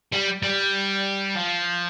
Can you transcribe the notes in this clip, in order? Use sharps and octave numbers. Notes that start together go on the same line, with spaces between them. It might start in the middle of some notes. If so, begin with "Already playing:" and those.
G3
G3
F3